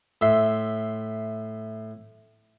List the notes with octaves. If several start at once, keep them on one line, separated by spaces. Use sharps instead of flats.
A2 E5 C6